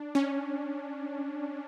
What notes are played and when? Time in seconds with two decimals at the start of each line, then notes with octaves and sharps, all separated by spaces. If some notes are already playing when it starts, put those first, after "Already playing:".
Already playing: D4
0.15 C#4